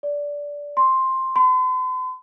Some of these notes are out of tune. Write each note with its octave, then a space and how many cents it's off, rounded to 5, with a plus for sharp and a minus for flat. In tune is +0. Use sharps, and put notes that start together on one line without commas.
D5 -15
C6 +5
C6 -45